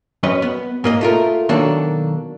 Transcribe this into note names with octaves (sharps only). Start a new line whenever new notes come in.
F#2 C#4 B4 D#5
B3
G#2 A#3 D#5
A3 F4 A#4
B2 D#3 F#3 A#3 D4 A4